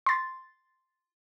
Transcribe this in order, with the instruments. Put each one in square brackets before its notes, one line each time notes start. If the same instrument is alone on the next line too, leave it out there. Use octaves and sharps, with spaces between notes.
[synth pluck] C6 A6